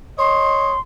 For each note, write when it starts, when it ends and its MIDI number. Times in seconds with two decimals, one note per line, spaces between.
0.19 0.74 73
0.19 0.74 75
0.19 0.80 84